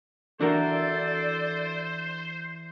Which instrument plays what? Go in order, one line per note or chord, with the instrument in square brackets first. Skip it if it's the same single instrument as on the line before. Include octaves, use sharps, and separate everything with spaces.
[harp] E3 [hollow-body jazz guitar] D4 F#4 A#4 [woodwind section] A4 D5 [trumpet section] C5